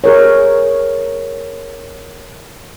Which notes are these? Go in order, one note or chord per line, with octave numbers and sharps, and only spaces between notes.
G#4 A#4 C#5